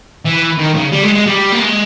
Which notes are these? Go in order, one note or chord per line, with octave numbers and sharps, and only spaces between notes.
E3
D#3
C#3
G3
G#3
G#3
G3
A#3
G#3